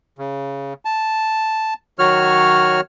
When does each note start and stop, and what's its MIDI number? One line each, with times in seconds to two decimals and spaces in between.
0.18 0.73 49
0.85 1.74 81
1.99 2.81 51
1.99 2.81 54
1.99 2.81 66
1.99 2.81 73
1.99 2.81 89